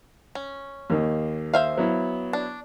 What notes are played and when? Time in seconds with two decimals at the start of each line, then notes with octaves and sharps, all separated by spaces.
0.35 C#4
0.90 D#2 A#3 D#4
1.53 C5 E5 F5
1.77 F#3 B3 E4
2.33 D4